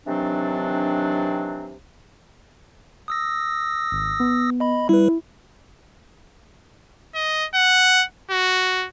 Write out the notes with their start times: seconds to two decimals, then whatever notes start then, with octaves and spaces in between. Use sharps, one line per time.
0.06 C3 D#3 E3 F#3 C4 D4
3.08 D#6 E6 A#6
3.92 G#1
4.20 B3
4.60 D#5 B5
4.89 G3 E4 B4
7.15 D#5
7.55 F#5
8.31 F#4